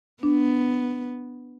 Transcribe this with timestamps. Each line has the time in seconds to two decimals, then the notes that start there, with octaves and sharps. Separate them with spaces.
0.23 B3 D4